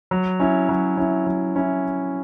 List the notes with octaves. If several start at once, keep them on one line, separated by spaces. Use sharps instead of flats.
F#3
C#4 E4
F#3
C#4 E4
F#3
C#4 E4